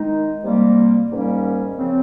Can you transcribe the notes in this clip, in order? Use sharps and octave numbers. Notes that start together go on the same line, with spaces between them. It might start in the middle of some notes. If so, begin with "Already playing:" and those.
Already playing: D#3 G#3 D#4
C3 G3 A#3
G#2 D#3 G3 A#3 C#4
C#3 F3 C4